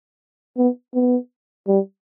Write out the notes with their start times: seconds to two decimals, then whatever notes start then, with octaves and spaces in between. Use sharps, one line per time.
0.58 B3
0.95 B3
1.68 G3